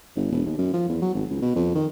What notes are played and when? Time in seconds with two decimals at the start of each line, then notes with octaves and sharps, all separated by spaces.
0.16 G1
0.32 E1
0.46 D#2
0.58 F#2
0.73 F3
0.89 E2
1.02 F#3
1.15 G#1
1.30 C#2
1.42 B2
1.56 F2
1.75 D#3